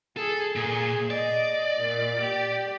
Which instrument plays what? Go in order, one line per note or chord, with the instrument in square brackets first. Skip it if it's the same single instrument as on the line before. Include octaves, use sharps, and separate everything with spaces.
[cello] G#4 [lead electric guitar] A4
[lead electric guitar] A#2 [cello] G#4
[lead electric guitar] D5 [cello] D#5
[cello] A#2
G4